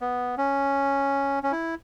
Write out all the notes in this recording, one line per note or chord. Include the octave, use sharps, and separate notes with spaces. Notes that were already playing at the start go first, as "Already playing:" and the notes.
B3
C#4
C#4
E4